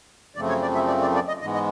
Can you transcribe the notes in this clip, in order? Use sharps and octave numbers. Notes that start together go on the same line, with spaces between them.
F#2 C#3 F3 A3 C4 D5
C#5
D5
E5
D5
D5
D5
D#5
G#2 E3 G#3 B3 D#5
D#5